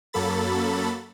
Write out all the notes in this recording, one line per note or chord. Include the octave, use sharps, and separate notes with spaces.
F#2 F#3 A#3 A4 B5 A6